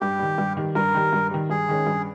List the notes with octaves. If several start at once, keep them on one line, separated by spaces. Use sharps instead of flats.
G2 G4
D#3 G3
G2
D#3 G3
G2 A#4
D#3 G3
G2
D#3 G3
G2 G#4
D#3 G#3 C#4
G2